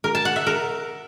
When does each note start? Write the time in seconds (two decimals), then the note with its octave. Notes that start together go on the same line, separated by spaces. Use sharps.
0.04 A#4
0.15 A5
0.25 F#5
0.36 E5
0.46 A#4